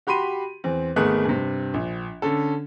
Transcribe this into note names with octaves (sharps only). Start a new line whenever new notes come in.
F#4 G4 B5 C6 D#7
E2 C4
G#1 A3 B3 G#4 A#4 F#6
G2 C3
A#1
D3 C#4 A4